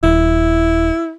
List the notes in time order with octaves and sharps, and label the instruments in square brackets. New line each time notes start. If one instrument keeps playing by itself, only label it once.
[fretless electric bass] D#1 [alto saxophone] E4